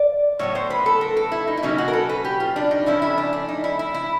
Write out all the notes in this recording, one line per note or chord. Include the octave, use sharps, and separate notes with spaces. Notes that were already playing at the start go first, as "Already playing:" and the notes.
Already playing: D5
A2 F#3 B3 C#5
C5
B4
A4
A#4
A4
E4
D#4
E4
B2 F#3 A#3 C#4 D#4
F#4
A#4
A4
B4
G4
F4
D4
D#4
A2 F3 A3 C#4 E4
E4
D4
D4
D#4
E4
E4
E4